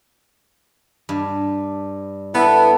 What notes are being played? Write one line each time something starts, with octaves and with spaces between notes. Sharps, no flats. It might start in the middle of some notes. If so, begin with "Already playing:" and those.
G2
B3 E4 A4